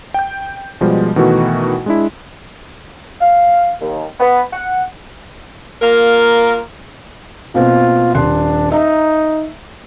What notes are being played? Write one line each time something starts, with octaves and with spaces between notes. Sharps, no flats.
G5 G6
B2 F3 G3 G#3
B2 D#3 E3 A3 F#4
G#3 D4 E4
F5
D#2
B3
F#5
A#3 F4 A#4
B2 A#3 C4 F4
D#1 D4 C6 F#6
D#4 E5 A#5